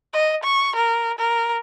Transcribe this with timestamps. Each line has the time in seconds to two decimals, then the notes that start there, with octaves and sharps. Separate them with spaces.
0.13 D#5
0.43 C#6
0.76 A#4
1.18 A#4